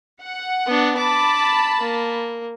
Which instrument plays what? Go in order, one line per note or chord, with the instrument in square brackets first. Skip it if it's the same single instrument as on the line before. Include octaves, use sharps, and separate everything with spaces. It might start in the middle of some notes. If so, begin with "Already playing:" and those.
[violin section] F#5
[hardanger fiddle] B3 D4
[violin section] A5 B5 [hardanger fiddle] D6
[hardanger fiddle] A#3